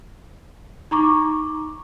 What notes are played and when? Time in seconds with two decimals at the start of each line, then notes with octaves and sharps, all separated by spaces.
0.91 D#4 A#5 C#6 D6